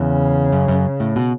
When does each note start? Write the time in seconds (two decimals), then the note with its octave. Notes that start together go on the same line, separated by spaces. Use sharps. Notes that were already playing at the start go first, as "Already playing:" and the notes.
Already playing: E2 C#3
0.53 F#2
0.68 F#2
1.00 A2
1.16 B2